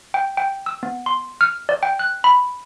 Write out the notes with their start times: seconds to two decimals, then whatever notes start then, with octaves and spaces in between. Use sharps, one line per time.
0.14 G5
0.37 G5
0.66 E6
0.83 B3
1.06 C6
1.41 F6
1.69 D5
1.83 G5
1.99 F#6
2.24 B5